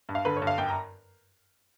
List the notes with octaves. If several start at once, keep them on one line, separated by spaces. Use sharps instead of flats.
G2
F5
D3 B4
C#5
G2
F5
F#2 G5
A#5